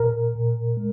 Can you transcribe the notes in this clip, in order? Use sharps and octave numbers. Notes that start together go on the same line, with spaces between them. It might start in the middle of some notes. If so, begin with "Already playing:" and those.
Already playing: A#2 A#4
A#2
G#3